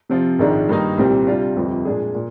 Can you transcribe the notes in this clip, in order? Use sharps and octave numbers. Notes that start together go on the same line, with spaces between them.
C3 F3 C4 F4
A#1 G#2 D#3 G#3 D4
G2 D#3 A#3 D#4
C2 A#2 G3 C4 G4
C3 G3 D4 F4
G1 F2 C3 F3
A#2 G#3 D4 G#4
A#2